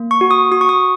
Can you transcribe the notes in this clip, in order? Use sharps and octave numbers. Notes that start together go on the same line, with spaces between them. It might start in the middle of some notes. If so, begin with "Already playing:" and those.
Already playing: A#3
C#6
F#4
D#6
F#4 D#6
C#6
D#6